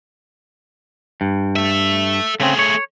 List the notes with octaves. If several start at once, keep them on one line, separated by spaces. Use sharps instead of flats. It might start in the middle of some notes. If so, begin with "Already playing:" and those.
G2
A4 E5
C#3 A3 C4 G#4
C#5